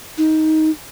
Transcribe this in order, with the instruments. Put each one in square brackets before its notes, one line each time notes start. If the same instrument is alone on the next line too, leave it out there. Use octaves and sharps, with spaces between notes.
[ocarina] D#4